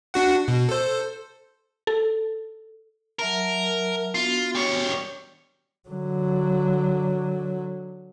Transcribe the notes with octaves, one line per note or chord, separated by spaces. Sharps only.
D4 F#4 F#5
B2
A4 C5
A4
F#3 A#4 E5 A5
B3 D4 F4 F#4
G3 C#5
D3 F#3